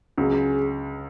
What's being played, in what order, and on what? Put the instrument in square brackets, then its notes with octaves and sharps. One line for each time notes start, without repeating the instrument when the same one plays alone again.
[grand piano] C#2 C#3 F#3 [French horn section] G#4